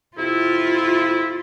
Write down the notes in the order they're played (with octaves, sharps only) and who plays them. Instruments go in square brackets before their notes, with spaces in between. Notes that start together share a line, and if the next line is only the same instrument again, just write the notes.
[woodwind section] F2 C3 E4 [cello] F4